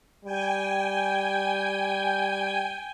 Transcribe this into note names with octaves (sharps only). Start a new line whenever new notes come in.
G3 G5 G#5